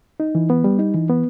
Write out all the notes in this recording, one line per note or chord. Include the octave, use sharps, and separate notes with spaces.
D#4
E3
B3
G3
D#4
E3
B3